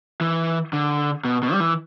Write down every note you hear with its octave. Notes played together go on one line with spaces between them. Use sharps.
E3
D3
B2
B2
G3
E3